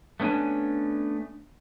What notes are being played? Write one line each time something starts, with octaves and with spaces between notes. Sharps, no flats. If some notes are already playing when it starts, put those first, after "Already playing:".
A3 B3 C#4 D4 G#5